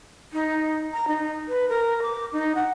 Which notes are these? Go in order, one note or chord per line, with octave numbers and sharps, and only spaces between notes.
D#4
A#5
D#4
B4
A#4
D6
D#4
F#5